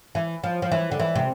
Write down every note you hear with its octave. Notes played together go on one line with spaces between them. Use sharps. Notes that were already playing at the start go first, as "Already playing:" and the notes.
E3
F3
F3
E3
D3
E3
C3